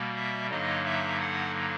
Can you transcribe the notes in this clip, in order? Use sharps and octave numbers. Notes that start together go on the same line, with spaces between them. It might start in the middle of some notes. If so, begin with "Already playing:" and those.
Already playing: B2 G3 A#3
E5
G2 D3 F#3 A#3 D#4 D#5
E5
F#5